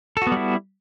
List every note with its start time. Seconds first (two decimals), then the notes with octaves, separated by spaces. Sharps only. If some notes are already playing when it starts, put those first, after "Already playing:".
0.17 A4
0.22 F#4
0.27 B3
0.32 G3
0.37 E4